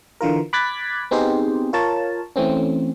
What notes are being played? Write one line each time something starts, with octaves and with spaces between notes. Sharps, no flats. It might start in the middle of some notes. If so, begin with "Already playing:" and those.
D3 E3 F4 A#4
B5 D6 F#6 G#6 A6 B6
B3 C4 D#4 G4 G#4 C5
F4 A#4 C#5 A5
E3 A3 C4 C#4